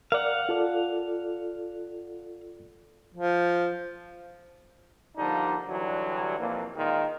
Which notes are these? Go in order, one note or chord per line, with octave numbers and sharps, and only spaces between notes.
A#4 D5 F5 F#5
F4 A4 D5
F3
D3 F3 G3 A#3 D4 D#4
D3 E3 F#3 G3
F2 A#2 E3 A#3
A#2 D#3 G#3 A#3 F4